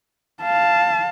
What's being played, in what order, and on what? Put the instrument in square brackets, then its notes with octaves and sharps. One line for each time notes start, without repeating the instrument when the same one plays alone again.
[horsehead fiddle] F5 A5